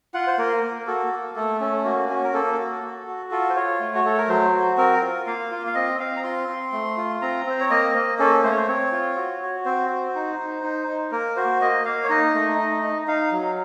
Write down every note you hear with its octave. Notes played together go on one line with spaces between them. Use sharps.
F4 F#5
C5
A#3 A#4
A#3
F#4 A4
A#3
A3 A4
C#4 A4
A#3 F#4
C#4 F#4
A#4
A#3 A4
F#4
F#4
F#4
F4 A4
C5
F4 C#5
A3
F#4
A3 A4
A#4
F#3 C5
F#4
C4 A#4
F4
A#3 F5
F4
F5
C4 D#5
C4 F5
A#5
F4 C6
C4
A3
F4
C4 A#5
C4 C5
C#5
A#3 D#5
A#3
C#4 A4
A3 C5
C#5
C5
C4 C#5
F4
F#4
F#4
C4 C5
F#4
D#4
D#4
D#4
D#4
A#3 A#4
F#4 C5
A#3 D#5
A#3 F5
C#5
D#4 D#5
A3
D#4
D#4
D#4 F5
F#3